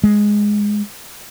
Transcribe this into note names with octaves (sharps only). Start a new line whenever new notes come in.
G#3